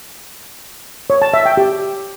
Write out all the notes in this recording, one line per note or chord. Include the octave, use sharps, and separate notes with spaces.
C#5
A5
E5
G5
G4